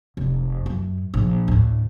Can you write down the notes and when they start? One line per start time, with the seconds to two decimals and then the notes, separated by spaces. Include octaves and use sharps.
0.17 F1
0.66 F#2
1.14 A#1
1.48 D2 A2